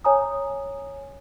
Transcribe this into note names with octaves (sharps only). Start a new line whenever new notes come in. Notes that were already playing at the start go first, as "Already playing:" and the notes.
C#5 G#5 A#5 D#6